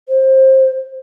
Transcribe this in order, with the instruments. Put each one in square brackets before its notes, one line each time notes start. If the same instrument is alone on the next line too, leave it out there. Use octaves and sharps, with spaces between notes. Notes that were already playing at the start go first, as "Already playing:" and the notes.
[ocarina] C5